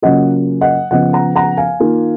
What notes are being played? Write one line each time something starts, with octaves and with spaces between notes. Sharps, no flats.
C#3 F#3 A#3 C#4 F4 D#5 F#5
D#5 F#5
C#3 F3 B3 D#5 F#5
F#5 A#5
F#5 A#5
F5 G#5
D#3 A#3 F4